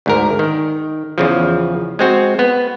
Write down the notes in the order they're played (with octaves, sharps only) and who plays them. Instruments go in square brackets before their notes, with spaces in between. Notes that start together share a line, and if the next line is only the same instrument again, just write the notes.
[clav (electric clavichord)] D2 G#2 A#4
D#3
E2 C#3 F3
G#3 C4 F#4
B3